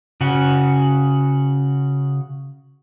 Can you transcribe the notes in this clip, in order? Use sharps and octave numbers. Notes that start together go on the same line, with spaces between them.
C#3 F#4